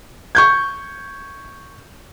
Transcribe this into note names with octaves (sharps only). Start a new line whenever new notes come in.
C#6 G6 G#6